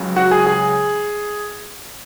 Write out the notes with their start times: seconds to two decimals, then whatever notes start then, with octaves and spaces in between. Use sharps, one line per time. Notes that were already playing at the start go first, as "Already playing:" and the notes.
Already playing: C#2 C#3 F#3
0.16 F#4 F#5
0.31 G#4 G#5
0.47 G#4 G#5